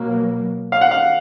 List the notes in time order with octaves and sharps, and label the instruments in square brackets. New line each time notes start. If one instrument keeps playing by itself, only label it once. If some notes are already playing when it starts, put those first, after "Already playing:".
Already playing: [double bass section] B2 F#3 A#3
[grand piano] F5
F#5
F5